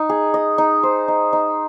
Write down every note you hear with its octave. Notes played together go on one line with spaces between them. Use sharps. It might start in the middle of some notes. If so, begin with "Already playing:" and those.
Already playing: D#4 D#5
G#4
D#5
D#4
C5
D#4
D#4